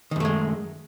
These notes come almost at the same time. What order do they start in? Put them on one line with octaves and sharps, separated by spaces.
D#3 F#2 A3 G#3